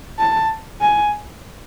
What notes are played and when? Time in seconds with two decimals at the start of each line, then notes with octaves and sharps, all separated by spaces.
0.19 A5
0.81 G#5